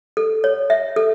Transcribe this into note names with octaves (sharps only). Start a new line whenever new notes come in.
A4
C#5
E5
A4